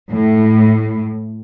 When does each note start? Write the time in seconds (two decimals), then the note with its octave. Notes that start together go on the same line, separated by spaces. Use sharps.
0.12 A2